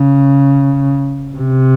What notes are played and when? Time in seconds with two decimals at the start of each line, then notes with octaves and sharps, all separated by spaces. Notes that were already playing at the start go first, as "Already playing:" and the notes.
Already playing: C#3
1.37 C3